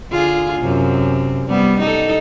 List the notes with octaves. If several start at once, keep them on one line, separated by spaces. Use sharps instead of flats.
D3 F4 G#4
F#2 C3
G3 B3
D#4 A4